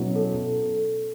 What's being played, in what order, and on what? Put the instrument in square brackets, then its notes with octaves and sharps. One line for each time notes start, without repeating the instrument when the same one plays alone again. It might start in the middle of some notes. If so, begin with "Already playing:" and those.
Already playing: [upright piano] B2 F#3 C#4 E4
[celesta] A4